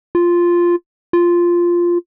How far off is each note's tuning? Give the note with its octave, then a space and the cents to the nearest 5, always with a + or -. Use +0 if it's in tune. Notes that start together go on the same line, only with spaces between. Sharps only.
F4 -5
F4 -5